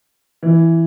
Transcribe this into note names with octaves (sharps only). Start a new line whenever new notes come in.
E3